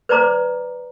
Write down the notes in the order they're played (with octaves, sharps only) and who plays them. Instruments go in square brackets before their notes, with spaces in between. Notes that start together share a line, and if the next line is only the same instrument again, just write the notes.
[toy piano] B4 C5 D5 A#5 D6